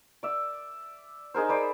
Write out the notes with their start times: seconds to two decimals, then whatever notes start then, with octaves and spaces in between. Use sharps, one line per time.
0.23 D5 E5
1.34 D#4 G#4 A#4 C5
1.49 C5 D5 B5